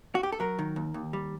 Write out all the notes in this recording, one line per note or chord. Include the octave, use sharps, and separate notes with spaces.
F#4
G4
A4
F#3 A#4
D#3
D#2
D#2
G3